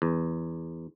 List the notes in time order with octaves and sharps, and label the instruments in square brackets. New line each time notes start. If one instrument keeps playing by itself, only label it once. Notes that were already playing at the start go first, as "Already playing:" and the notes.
[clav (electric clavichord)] E2